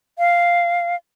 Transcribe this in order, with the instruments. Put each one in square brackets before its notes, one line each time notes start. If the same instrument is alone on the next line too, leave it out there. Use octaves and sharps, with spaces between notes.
[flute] F5